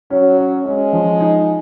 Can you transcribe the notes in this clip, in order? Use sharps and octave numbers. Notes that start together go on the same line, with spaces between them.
F#3 C#4
C#4
G#3 C#4
F3
D#4